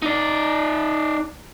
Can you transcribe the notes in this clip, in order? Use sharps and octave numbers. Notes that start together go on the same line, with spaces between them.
D#4 D5